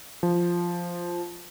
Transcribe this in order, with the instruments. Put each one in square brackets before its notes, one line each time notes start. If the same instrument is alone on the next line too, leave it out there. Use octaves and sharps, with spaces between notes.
[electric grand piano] F3